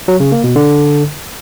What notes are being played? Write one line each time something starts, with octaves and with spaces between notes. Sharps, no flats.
F#3
C#3
A#3
B2
D3